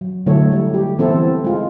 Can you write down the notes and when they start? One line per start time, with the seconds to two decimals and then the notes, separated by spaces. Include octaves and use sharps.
0.01 F#3
0.26 D3 F#3 A3 E4 A4 C#5
0.52 G3
0.74 G4
0.99 E3 B3 C4 E4 A4
1.44 G#3 F4